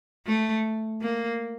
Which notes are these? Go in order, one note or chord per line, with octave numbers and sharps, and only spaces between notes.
A3
A#3